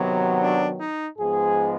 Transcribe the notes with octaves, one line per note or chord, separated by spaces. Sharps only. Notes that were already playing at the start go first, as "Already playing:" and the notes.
Already playing: C3 D#3 F#3 B3
D4
D#4
G#2 F3 G#3 B3 G#4